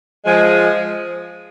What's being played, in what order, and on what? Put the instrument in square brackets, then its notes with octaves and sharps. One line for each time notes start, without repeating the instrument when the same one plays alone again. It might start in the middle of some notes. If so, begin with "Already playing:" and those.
[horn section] F3 G#3